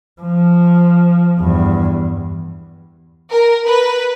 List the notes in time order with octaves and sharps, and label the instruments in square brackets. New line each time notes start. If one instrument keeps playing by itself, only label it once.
[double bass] F3
E2 G2
[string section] A#4
B4